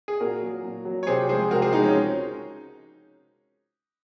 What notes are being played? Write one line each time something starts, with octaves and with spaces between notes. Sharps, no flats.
G#4
A#2 F#4 A#4
F#3
A#2
F#3
C#5
C3 G#4 C5
F3 G#3 G#4 C5
C3 F#4 A#4
G#4 C5
F3 G#3 D#4
C#4